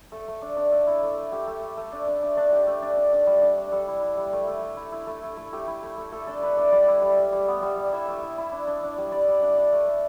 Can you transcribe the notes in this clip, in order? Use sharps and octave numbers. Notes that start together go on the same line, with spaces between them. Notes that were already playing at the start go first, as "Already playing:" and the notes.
A3 A4
A3
D4
D4
A3
E4
A3
A3
A3 G4
A3
A3
A3
D4
D4
D4
D4
D4 G4
A3
D4
D4
D4
G3
D4
D4
G3 A4
E4
E4
G3
A3
A3
A3
E4
E4
A3
A3
A3
A3 G4
E4
A3
A3
A3 A4
D4 A4
D4 B4
D4 D5
G3 D5
E4
G3
G3
G3
B3
G3
G3
E4 E5
A3
E4
E4
D4
D4
D4
G3
G3 D5
G3
D4
D4
A3
A3